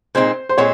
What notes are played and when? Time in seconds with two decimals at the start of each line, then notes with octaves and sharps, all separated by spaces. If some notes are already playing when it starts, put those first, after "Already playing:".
0.15 A#2 G#3 C4 D#4 C5
0.49 C5
0.58 A#2 G#3 C4 C#5